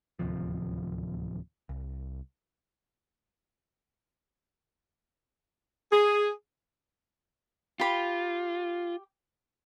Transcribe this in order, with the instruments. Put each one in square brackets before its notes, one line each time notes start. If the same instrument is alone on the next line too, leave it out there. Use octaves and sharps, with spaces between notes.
[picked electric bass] D1 D#2 C3 F3
C2
[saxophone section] G#4
[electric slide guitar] F4 [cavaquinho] G4 B5